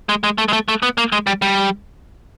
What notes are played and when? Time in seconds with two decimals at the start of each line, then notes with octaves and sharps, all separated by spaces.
0.09 G#3
0.24 G#3
0.38 A3
0.48 G#3
0.53 A3
0.68 A3
0.83 B3
0.98 A#3
1.12 G#3
1.27 G3
1.42 G3